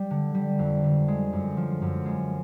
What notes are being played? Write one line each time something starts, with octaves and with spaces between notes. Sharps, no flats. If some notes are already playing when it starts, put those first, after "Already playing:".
Already playing: G3
D3
G3
F2
D3
G#3
F#2
F3
F#2
G#3